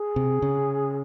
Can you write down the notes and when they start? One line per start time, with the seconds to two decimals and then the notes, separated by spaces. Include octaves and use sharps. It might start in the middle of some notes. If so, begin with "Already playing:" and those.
Already playing: G#4
0.16 C3
0.42 C#3